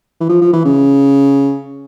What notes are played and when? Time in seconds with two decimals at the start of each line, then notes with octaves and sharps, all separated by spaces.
0.20 E3
0.29 F3
0.41 F3
0.53 E3
0.65 C#3